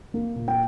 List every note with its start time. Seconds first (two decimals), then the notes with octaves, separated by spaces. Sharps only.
0.14 A#3
0.36 A#2
0.48 G5